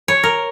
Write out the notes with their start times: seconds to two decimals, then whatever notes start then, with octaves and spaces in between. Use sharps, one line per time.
0.08 C#5
0.23 A#4